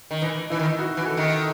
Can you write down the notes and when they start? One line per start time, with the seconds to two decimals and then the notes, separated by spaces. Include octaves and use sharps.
0.11 D#3
0.22 E3 D#4
0.50 E3 E4
0.59 D#3
0.79 F#4
0.97 E3
1.07 A4
1.17 D#3